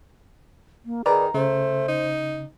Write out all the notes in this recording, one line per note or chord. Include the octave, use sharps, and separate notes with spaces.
A#3
D#3 G#4 B4 D5 A#5
C#3 A3 C5
D#4